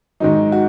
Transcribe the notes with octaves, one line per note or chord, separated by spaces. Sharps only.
G#2 D#3 F#3 D#4
F#4